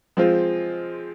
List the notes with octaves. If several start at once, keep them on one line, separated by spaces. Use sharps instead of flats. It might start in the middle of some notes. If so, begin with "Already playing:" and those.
F3 G#3 C4 F4